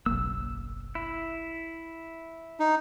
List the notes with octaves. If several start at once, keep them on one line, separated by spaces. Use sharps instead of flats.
F#1 B1 A#3 E6
E4
D#4